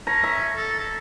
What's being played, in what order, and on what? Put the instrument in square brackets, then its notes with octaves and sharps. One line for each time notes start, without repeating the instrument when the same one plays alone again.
[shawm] C#4 [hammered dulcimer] A#5
[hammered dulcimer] E5
[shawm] A4
A4